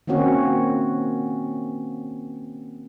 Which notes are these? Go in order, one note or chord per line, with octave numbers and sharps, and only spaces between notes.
D#3 A#3 C4 C#4 F#4